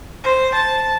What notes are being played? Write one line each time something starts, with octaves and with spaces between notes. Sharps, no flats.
C5
A5